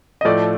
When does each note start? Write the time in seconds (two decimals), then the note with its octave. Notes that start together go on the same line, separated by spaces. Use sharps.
0.21 D#5
0.25 A2 F3 A3 D5